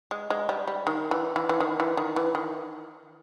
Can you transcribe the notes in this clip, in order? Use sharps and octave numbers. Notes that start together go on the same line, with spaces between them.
G#3
G#3
G3
G3
D#3
E3
E3
E3
D#3
E3
D#3
E3
D#3